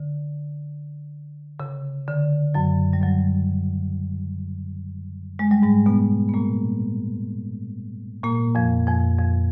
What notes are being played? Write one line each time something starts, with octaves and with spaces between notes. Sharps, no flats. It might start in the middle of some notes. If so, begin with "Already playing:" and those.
Already playing: D3
C#3
D3
F#2 F#3
G3
F#2 F#3
G#3
G3
G#2 G#3
B2 B3
B3
A#2 A#3
A#2 A#3
F2 F3
F2 F3
F2 F3